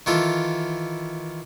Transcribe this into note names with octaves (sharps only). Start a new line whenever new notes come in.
D#3 E3 F4 A4